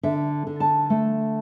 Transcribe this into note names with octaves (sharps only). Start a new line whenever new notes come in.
D3 E5
D3
A5
A3